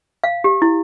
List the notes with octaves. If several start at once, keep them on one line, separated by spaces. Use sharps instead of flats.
F5
G4
E4